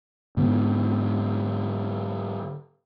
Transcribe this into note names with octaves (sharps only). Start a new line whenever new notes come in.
G#2 D3 B3